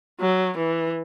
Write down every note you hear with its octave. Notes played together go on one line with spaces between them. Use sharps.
F#3
E3